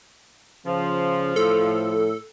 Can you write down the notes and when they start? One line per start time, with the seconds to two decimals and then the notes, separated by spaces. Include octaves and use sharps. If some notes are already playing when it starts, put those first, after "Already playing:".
0.66 C#3 F3
1.36 A2 A4